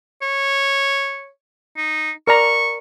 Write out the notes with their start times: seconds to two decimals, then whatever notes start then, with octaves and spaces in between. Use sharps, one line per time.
0.22 C#5
1.77 D#4
2.27 A#4 D5 A#5 C#6